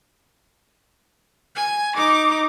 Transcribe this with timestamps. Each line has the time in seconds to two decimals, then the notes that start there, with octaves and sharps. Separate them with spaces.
1.55 G#5
1.95 D#4 D6